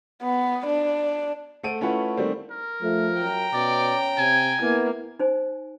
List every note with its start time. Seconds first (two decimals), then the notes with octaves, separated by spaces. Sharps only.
0.22 B3
0.67 D4
1.63 A3 A4 C5 F#5 D7 D#7
1.81 A3 C#4 E4 F4 B4 F#5
2.17 D#3 G3 A3 A#3 C4
2.51 A#4
2.82 F3 A3
3.21 F#2 G5 A#5
3.54 B2 C#4 D5
4.18 C3 G#5
4.61 A#3 B3 E4
5.19 D#4 C5 G#5